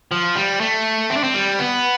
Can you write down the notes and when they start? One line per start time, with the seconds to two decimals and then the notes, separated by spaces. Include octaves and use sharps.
0.11 F3
0.36 G3
0.60 A3
1.10 C4
1.17 D4
1.24 C4
1.34 G3
1.59 B3